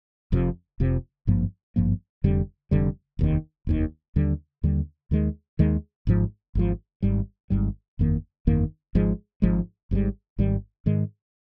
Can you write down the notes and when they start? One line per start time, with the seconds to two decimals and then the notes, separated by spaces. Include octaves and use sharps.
0.32 F1 F2 C3 F3
0.80 F1 F2 C3 F3
1.27 G#1 G2 F3 A#3
1.76 G#1 G2 F3 A#3
2.24 F1 F2 D3 G3
2.71 F1 F2 D3 G3
3.19 F1 D#2 D#3
3.67 F1 D#2 D#3
4.16 D#2 D3 G3
4.63 D#2 D3 G3
5.11 D#2 D#3 G#3
5.59 D#2 D#3 G#3
6.07 G#1 G#2 F3
6.55 G#1 G#2 F3
7.02 G#1 G#2 G3
7.50 G#1 G#2 G3
7.99 G1 F2 D#3 A#3
8.47 G1 F2 D#3 A#3
8.95 G#1 G#2 F3 G#3
9.42 G#1 G#2 F3 G#3
9.91 G#1 G#2 D#3 G3
10.38 G#1 G#2 D#3 G3
10.86 G#2 D#3 G#3